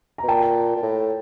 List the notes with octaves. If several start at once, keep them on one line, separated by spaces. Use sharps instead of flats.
A#5
B2
A#2 G5 A5
A#2
A2